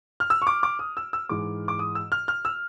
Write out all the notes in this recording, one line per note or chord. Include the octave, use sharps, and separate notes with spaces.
F6
E6
C#6
D6
D6
D#6
E6
E6
G#2 E3 G#3 D6
D6
D#6
E6
F6
F6
E6